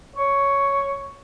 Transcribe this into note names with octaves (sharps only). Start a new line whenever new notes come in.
C#5